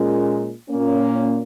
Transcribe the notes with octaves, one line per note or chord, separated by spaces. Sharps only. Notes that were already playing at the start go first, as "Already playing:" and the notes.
Already playing: A#2 G#3 C#4
A#2 A#3 C#4